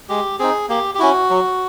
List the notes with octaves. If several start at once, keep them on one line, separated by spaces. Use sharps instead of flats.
G#3 G4
C4 D#4 G#4
A#3 G4
G4
C#4 E4 F#4
F#3